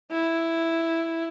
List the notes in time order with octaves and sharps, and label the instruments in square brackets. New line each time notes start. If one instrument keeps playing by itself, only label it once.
[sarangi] E4